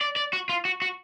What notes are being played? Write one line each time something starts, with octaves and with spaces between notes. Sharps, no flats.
D5
D5
F#4
F4
F#4
F#4